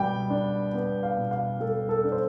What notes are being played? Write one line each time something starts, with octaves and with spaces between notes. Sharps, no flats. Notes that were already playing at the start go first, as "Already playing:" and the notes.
Already playing: B2 G3 B3 G5
D4
B3
F5
B2
F5
G3 A4
A4
D4
C5